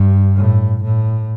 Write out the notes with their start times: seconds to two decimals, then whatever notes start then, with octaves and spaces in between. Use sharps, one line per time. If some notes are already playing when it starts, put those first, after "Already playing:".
Already playing: G2
0.36 A2
0.83 A2